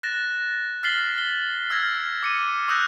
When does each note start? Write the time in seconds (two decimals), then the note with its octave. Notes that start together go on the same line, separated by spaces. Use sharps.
0.03 F#6 A6 A#6 E7
0.83 F6 A6 B6 C7 F#7 G7
1.18 G7
1.70 E6 F6 G#6 A#6
2.23 D6 C#7 D#7
2.68 C#6 D#6 E6 F#6 G6 A#6